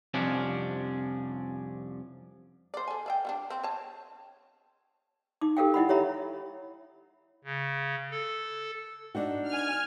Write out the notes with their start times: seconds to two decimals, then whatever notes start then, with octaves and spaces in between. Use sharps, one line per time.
0.14 C2 F2 C3 F3 C#4 D4
2.74 C5 D5
2.87 A4 G#5
3.06 D5 E5 G5
3.25 G3 B3 D4
3.50 C4
3.63 C#5 A5
5.41 D#4 D6
5.57 G4 A4 A#4 F5 G5
5.74 E4 D#5 F#5 B5
5.89 G4 C#5 E5 A#5 B5
7.45 C#3
8.11 A4
9.15 D4 D#4 F#4
9.48 G#5 F6